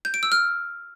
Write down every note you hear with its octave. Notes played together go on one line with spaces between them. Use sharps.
G6
D7
E6
F6